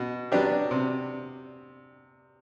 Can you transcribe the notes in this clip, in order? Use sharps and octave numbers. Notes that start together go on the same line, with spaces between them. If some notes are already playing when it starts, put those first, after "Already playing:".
Already playing: B2
F#3 B3 D4 G4
C3